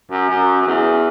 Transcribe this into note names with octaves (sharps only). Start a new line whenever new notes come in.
F#2
F#2
F#2
E2